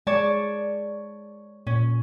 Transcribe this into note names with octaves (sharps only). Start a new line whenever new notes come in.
G#3 C#5 D5 A5
A#2 C#4